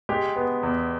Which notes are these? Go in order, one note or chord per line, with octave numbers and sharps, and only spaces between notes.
G#3 G4
B3
E2